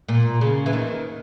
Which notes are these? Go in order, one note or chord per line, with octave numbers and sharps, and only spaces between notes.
A#2
C#3
E3
D#2 D#3